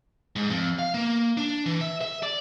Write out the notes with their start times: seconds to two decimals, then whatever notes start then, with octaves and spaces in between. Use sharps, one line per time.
0.36 G#2
0.50 F2
0.79 F5
0.94 A#3
1.37 D4
1.66 E3
1.81 E5
2.01 E5
2.23 D5